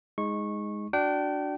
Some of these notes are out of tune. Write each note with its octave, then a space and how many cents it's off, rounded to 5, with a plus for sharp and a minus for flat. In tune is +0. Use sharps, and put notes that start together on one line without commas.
G#3 +0 D#4 +20 C#6 -20
D4 +0 F#4 +0 G5 -30